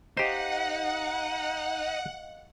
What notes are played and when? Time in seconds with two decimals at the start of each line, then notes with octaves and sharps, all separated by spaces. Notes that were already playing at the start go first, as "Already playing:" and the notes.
0.17 D#4 G4 C5 D#5 F5 F#5